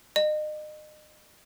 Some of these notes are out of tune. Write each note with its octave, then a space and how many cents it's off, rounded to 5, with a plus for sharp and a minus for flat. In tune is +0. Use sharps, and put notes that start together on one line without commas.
D#5 -35